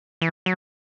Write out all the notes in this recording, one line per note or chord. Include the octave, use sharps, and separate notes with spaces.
E3
F#3